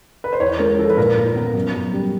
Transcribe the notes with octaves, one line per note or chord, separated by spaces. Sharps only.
B4
C5
E2 C#5
G#3 A#4
F3 A4
B4
A#2 A#4
A#2
B3
F#2
F#2
G3